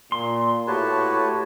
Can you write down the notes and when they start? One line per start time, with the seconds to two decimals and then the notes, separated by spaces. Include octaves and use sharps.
0.12 A#2 C6
0.67 A2 F#4 G4 B4 C#5 A5